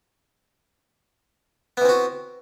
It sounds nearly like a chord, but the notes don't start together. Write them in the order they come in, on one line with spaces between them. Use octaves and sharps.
B3 E3 C4 F#4